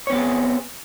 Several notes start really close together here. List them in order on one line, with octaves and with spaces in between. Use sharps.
C#5 C4 B3 G4 G#4